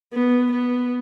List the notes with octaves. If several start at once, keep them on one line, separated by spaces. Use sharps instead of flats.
B3
B3